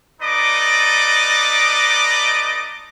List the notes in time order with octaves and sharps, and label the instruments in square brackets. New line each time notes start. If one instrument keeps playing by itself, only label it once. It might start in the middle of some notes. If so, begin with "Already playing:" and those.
[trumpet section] A3 D#4 B4 D5 D#5 D6